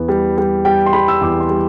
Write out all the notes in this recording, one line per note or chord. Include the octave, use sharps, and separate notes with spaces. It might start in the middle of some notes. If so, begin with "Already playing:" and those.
Already playing: E2 B3
G3
G3
G3 G5
C6
G3 B5
E6
E2 D6
C6
G3